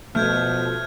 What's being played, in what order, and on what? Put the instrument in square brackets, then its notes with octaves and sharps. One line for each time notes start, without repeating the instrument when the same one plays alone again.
[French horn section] B2 F3 [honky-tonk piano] A3 [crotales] F6 G6 G#6